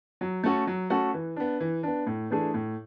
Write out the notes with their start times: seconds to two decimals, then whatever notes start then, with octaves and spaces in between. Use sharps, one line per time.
0.21 F#3
0.43 A3 C#4 F#4 A4
0.67 F#3
0.90 A3 C#4 F#4 A4
1.14 E3
1.36 B3 D4
1.60 E3
1.83 B3 D4
2.06 A2
2.30 E3 A3 D4 G#4
2.54 A2